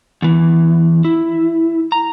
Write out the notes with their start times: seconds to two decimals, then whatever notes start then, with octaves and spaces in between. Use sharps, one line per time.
0.22 E2 E3
1.05 E4
1.92 A#5